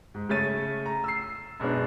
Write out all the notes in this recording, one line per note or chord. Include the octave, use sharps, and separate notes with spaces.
G#2
C#3 A3 C#5 A6 D#7
A#5
E6 C7
F#2 B2 G#3 B3 D4